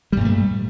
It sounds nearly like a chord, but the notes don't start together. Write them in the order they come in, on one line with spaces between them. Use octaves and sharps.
G3 G2 A#2 A3